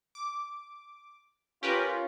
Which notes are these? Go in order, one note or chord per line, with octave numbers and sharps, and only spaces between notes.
D6
C#4 F4 G4 A#4 B4